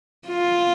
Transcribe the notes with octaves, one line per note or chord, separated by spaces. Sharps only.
F4